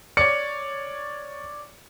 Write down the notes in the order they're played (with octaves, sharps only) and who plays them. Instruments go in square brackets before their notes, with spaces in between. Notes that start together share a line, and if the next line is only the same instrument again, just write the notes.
[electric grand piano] C#5 D5 [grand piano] C#7